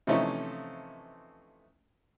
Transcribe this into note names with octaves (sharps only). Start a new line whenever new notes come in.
C3 E3 F3 A3 C#4 D#4